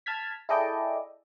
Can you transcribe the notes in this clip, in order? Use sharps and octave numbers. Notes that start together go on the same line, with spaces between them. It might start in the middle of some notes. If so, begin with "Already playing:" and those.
A5 F6 G#6 B6
E4 G#4 A4 D5 D#5 G5